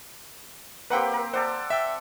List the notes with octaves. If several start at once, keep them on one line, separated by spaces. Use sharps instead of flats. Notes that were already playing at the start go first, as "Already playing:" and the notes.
A#3 C4 G4 B4 F#5 G5
A#4
A4 C5 D5 F#5
E5 G5